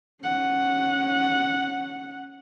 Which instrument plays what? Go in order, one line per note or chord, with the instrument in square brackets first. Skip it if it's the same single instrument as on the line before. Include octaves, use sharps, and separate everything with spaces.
[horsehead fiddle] C#4 F#5